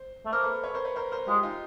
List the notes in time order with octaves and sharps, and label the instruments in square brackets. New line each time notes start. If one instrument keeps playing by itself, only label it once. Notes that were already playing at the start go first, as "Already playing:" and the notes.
Already playing: [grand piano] C5
[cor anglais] A3
[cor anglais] A#3 [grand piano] A#4 C5
[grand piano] A4 B4
B4 C#5
A#4 C5
B4 C#5
A#4 C5
A#4 C5
[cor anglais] G#3 [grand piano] F4 G4
[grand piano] D#4 F4